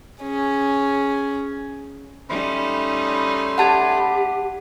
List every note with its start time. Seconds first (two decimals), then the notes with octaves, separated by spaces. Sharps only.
0.23 C#4 G#4
2.29 G3 A3 C#4 D#4 B5 C6
3.58 G4 F#5 A5 G#6